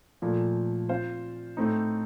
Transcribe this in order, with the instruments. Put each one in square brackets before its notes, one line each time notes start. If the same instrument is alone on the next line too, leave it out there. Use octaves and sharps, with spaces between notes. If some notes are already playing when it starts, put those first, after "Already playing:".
[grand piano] A#2 F3 A3
C4 F4 C5 F5
A2 A3 C4 D#4